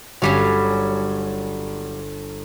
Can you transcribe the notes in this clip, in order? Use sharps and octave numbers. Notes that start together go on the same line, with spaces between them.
G1 F#3 G3 C#4 C7